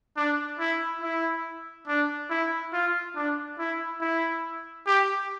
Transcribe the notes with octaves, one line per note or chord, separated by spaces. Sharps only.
D4
E4
E4
D4
E4
F4
D4
E4
E4
G4